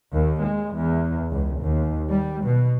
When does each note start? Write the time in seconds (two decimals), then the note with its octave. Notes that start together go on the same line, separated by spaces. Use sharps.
0.13 D#2
0.44 G#3
0.75 E2
1.31 C#2
1.60 D#2
2.12 G3
2.45 B2